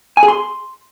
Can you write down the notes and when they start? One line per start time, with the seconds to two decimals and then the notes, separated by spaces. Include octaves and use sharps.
0.17 G#5
0.23 G#4
0.28 C6